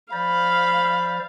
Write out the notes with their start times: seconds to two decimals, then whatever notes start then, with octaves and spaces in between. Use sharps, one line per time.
0.13 F3 C5 D5 F5 B5